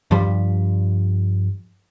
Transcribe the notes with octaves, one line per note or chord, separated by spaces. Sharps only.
G2 F3 G3